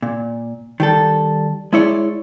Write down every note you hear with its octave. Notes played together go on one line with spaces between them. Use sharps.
A#2
D#3 G3 A4
G#3 E4 C#5 D5